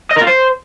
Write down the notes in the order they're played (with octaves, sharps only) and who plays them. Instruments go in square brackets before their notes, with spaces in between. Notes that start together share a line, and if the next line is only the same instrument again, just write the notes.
[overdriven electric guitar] D#5
A#4
F4
C5